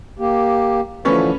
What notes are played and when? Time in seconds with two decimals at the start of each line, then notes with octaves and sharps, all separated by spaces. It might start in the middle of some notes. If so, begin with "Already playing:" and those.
0.19 A#3 G4
1.05 D3 E3 F3 A3 C#4 B4